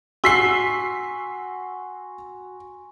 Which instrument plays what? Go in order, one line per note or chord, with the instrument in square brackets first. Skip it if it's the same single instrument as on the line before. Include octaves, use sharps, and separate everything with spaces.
[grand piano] F#4 [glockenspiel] G#5 C6 C#6 [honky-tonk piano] E6 B6 C7